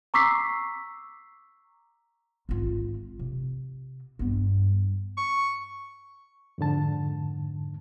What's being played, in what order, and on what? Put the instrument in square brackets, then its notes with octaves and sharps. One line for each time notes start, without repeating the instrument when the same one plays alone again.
[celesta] A#5 C#6 D6 E6 B6 C7
[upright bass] G#1 F4
C3
G2 B3
[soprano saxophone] C#6
[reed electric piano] F2 G#2 D3 A5